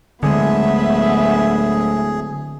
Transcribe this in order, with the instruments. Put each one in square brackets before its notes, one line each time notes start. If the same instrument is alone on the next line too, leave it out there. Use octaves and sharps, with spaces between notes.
[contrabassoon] D1 [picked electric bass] D3 G#3 [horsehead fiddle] B3 E5 [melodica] G#4